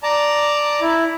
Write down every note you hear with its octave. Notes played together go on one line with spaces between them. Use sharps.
D5 A5 A#5
E4